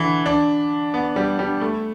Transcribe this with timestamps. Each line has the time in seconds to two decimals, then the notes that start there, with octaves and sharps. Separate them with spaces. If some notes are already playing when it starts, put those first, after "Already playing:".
Already playing: D3 E3
0.26 D4
0.94 B3
1.16 G3
1.39 G3
1.61 A3